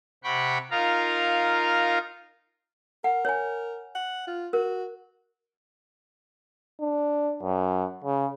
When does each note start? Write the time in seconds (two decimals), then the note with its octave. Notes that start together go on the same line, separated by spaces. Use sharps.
0.24 C3 F#5 G5 B5 C#6
0.71 D#4 F4 A#4 F5 A#5
3.04 A#4 F#5
3.25 C#5 G#5
3.95 F#5
4.27 F4
4.53 F#4 A#4
6.80 D4
7.43 F#2
8.04 C#3